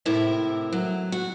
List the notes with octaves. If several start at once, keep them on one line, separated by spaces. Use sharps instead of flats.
A2 C3 E4 A#4 E5
F#3
F#4